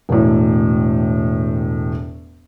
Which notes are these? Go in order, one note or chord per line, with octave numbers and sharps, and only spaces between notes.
E1 A2